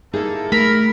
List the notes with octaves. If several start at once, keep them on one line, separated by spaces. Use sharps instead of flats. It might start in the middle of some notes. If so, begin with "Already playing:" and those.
A#3 D#4 E4 G#4 A4
A3 A#4 A#5 B5